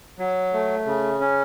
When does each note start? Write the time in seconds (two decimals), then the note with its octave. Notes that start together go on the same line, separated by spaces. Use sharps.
0.18 F#3
0.53 A3
0.86 C#3
1.20 C#4